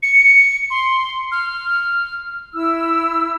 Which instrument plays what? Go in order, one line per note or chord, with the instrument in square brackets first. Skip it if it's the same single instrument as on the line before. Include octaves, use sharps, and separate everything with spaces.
[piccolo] C#7
C6
F6
[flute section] E4 E6